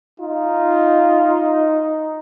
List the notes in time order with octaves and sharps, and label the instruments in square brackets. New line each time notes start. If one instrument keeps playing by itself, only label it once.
[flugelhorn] D#4 [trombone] F4